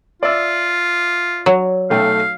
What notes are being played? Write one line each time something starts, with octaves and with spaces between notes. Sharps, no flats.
F4 D5 E5 E6
F#3
B1 A3 F5 G5